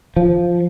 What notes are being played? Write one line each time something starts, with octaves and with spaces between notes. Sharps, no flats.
F3